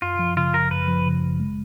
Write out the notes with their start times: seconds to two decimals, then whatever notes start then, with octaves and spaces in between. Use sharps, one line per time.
0.02 F#2 F4
0.19 F3
0.37 C#3 F4
0.53 G#1 A#4
0.71 F#2 B4
0.88 F3
1.06 C#3
1.22 G#1
1.40 G#3